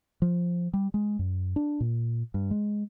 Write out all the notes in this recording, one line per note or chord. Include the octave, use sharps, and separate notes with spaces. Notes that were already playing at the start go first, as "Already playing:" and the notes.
F3
G3
G#3
F#2
D4
A#2
G2
G#3